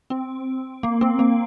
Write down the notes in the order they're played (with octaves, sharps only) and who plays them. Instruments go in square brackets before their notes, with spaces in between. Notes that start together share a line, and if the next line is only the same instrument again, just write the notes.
[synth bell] C4
A#3
C4
A#3